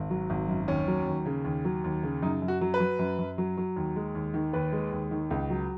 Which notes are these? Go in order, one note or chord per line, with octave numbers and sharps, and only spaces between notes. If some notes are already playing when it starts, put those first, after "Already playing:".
Already playing: G#1
F#3
G#1
F#2
D#2 C#4
F#3
D#2
C#3
D#2
F#3
D#2
C#3
F#2 D#4
F#2
F#4
F#3
B4
F#3
F#2
F#2
F#3
F#3
D#2
G#3
D#2
D#3
D#2 B4
G#3
D#2
D#3
C#2
F#3